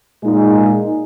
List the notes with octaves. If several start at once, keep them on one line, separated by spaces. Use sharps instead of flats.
A#2 G#3 D#4 G#4